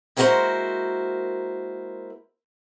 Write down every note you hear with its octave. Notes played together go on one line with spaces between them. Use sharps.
G#3 A#3 E4 F#4 A#4 C5